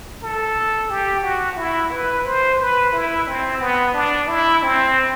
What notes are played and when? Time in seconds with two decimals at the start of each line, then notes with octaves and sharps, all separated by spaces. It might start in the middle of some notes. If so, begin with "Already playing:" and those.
0.22 A4
0.90 G4
1.23 F#4
1.57 E4
1.91 B4
2.25 C5
2.60 B4
2.93 E4
3.27 C4
3.60 B3
3.94 D4
4.28 E4
4.63 C4